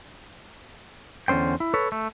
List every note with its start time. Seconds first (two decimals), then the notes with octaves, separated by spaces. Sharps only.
1.28 E2 D3 C#4 C5 G5
1.60 E4
1.74 A4 B4 C#5
1.92 A3